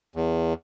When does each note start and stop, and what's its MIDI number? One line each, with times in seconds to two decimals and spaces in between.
0.16 0.54 40